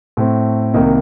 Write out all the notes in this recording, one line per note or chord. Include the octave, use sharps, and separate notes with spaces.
A2 A3 C4
C2 C3 D#3 A#3 D#4